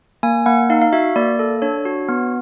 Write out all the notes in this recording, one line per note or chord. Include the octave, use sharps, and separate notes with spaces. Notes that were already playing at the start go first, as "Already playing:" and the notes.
A#3 G#5
A#3 F#5
D#4 F5
F5
F#4 E5
A#3 D5
A4
D4 C#5
F#4
B3